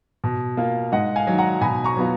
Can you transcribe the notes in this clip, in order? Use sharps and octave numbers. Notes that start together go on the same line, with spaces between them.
B2
A#3 F4
G#2 D#5 F#5
F5 G#5
D#3 F#3
F#5 A#5
B2 G#5 B5
A#5 C#6
F#3 B3 F4